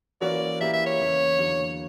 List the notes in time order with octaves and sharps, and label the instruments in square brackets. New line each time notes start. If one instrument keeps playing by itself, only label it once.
[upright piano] E3 A#3 C#4 F#4 A#4 [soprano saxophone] D5
[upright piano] E3 A#3 E4 G4 A#4 [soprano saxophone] E5
[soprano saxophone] E5
C#5
[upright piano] E2 C#3 E3 A#3
E2 D3 F#3 A#3